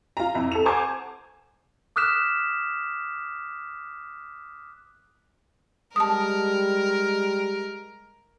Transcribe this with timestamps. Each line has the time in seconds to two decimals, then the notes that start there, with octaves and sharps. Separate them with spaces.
0.17 F4 A#5
0.35 F2 E4 A#5
0.52 A4 F7
0.65 C5 F#5 G#5 A5 D6 G#6
1.96 D6 D#6 F6 F#6 B6 E7
5.96 G3 G#3 A#4 A5 D#6